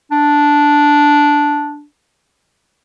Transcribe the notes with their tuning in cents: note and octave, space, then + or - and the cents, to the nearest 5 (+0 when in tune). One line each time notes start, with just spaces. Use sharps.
D4 -5